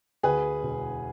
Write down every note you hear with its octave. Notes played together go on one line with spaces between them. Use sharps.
D2 G#4 B4
E1